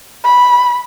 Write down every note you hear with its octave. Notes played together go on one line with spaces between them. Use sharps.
B5